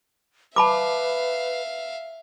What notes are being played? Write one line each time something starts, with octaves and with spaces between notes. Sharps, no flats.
B4 E5 F5 A5 B5 D6